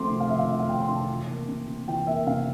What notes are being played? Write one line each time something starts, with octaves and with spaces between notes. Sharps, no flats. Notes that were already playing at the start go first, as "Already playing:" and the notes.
Already playing: F3 A3 C4 C6 D6
C3
F5
F3 E5
F5
A3 E5
F5
C4 G5
C6
C3
A5
E3
A#3
C3
C3
E3 G5
A#3 E5
C3 F5